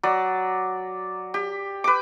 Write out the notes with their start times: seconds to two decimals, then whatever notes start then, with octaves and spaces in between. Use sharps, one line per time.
0.03 F#3 D5
1.34 G4
1.84 B4 D6